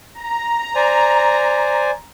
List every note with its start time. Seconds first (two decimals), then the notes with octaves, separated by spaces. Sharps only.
0.19 A#5
0.75 C5 D5 G#5